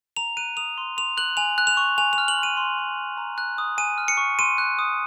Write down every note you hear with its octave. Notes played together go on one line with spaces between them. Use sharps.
A#5 F7
F#6 D#7
D#6 F7
C6
C6 F7
F#6 F#7
G#5 F7
F#6
F7
C#6
G#5 F7
F7
F6
F#7
C6
D#7
C6
C6
F6
A#5
F#6
D#6
G#5 D#7
F6
C#7
C#6
C6 D#7
F#6
D#6